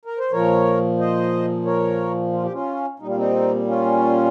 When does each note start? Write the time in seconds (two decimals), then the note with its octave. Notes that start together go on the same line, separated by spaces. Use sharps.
0.05 A#4
0.18 C5
0.31 A#2 F3 A#4 C#5
0.99 C5 D#5
1.65 A#4 C#5
2.33 F4
2.43 G4
2.52 C#4 F4
2.99 A#2 G3 D#4
3.08 F4
3.15 C4 D#4
3.66 C#4 F4